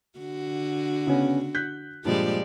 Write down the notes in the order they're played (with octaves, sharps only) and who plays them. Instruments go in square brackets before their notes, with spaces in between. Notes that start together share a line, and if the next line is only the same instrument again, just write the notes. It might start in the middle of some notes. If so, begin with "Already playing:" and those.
[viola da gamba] D3 F#4
[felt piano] C#3 B3 C#4
F#6 G6 B6
[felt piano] G2 A#2 F3 [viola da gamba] G3 G#3 D5